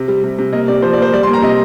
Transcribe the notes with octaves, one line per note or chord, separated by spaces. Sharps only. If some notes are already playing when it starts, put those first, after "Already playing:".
Already playing: C3
G3
C3
C3
A#3 D#5
C3 D5
F3 C5
D5
A#3 C5
G3 D5
C6
A#3
A#5
C3 D#5